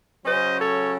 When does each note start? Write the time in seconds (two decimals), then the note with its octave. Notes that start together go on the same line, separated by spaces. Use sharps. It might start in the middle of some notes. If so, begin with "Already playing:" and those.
0.25 C#3 F#3 C#4 C5 D#5
0.59 A4 C#5